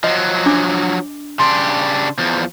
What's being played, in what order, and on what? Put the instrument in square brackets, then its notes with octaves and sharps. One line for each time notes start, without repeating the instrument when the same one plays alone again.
[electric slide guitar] F3 F#3 [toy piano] D#5
[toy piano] D4 D6
[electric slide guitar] C#3 D4 G4 [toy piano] C6
[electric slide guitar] E2 F3